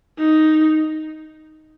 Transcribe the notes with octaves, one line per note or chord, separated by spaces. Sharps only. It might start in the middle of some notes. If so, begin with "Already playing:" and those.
D#4